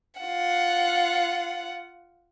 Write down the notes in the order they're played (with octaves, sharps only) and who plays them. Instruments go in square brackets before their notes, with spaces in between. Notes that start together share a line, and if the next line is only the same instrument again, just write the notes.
[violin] F4 F#5